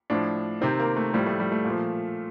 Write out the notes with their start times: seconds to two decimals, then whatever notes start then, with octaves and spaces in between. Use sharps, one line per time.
0.10 A2 F3 D4
0.61 C3 D#3 C4
0.79 A#3
0.96 A3
1.13 A2 F3 G3
1.26 A3
1.40 G3
1.52 A3
1.65 A#2
1.70 F3